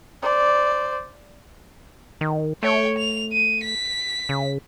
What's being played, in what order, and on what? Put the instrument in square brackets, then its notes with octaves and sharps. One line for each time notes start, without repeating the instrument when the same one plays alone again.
[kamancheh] C5 D5
[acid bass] D#3
[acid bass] A3 [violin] C#5 G5
[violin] F7
D#7
B6
[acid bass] C#3